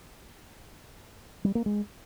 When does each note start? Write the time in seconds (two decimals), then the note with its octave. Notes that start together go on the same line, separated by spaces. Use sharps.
1.44 G3
1.55 A#3
1.66 G#3